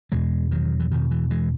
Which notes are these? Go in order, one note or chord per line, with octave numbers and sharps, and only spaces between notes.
E2 B2 E3 G#3
D#3 F#3
E3
E2 B2 D#3
E3
E3 G#3